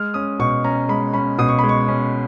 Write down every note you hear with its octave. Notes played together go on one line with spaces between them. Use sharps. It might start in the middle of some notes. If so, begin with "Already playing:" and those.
Already playing: G#3 F6
C#4 D#6
B2 C#6
C#4 A#5
G#3 B5
C#4 B5
B2 D#6
C#6
G#3 B5
C#6
C#4